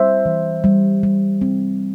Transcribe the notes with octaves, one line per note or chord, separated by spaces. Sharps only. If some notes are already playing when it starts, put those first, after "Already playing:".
Already playing: G3 C5 E5
E3
G3
G3
C4